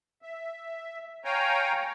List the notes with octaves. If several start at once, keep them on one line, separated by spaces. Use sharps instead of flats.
E5
C#5 F5 G5 G#5 A#5